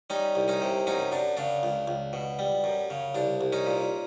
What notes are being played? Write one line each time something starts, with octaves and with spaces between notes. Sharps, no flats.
G3 C#4 D#4
C2
C#4 D#4
C3
F#2 C#4 D#4
F#2 D4
C#3 D4
C#2
C#2
B2
G3
F#2
C#3
C2 D4
C2
C#4 D#4
A#2